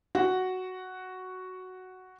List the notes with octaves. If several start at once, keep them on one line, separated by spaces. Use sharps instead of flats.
F#4 F#5